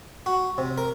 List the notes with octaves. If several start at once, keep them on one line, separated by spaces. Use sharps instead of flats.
F#4
C3
A#4